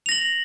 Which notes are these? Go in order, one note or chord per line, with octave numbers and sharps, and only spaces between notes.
A#6 F7 F#7